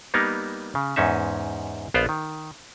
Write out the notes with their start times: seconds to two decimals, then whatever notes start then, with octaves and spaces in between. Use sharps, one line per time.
0.14 G3 A#3 B3 D#4 A#4
0.75 C#3
0.96 E2 G#2 C#4 D#4 E5
1.94 A#1 B3 F4 C5 D5 F5
2.09 D#3